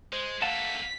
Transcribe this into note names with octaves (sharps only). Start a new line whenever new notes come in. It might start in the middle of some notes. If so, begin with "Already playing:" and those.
G#3 C5
A3 A#3 F5 F#5 A5 A6 B6 D#7